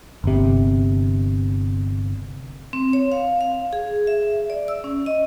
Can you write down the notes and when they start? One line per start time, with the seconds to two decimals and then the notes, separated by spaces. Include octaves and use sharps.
0.24 G1 C3
2.73 C4
2.93 C#5
3.12 F5
3.41 F5
3.73 G#4
4.07 E5
4.50 D5
4.68 E6
4.84 C#4
5.06 D#5